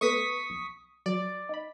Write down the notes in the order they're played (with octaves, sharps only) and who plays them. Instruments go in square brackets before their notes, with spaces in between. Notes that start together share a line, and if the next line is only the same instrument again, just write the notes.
[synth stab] A3 B3 B4 [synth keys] C#6 D#6 B6
[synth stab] B1
[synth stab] F#3 [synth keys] D5
[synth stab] D#4 B5